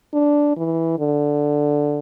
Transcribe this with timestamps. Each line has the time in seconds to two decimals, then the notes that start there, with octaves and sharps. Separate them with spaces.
0.13 D4
0.57 E3
0.98 D3